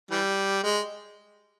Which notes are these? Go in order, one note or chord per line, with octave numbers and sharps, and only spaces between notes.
E3 G3
G#3